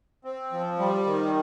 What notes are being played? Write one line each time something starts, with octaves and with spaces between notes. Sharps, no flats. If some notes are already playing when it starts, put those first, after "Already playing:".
C4
F3
G3
D#3